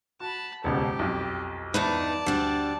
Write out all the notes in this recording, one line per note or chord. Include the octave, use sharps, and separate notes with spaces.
F#4 A5 B5
D#1 C#2 B2 G4
B1 F2
E2 G2 D#4 B4 D5 A5
D2 G3 D4